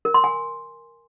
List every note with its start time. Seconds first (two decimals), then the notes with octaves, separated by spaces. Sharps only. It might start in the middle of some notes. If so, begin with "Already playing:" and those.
0.05 A#4
0.14 C6
0.24 G#5